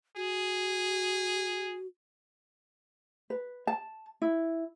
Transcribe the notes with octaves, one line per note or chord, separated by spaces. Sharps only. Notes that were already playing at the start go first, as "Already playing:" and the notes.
F#4 G#4
B4
A5
E4